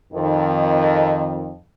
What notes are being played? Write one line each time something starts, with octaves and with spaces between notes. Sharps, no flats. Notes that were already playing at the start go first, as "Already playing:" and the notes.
F2 D#3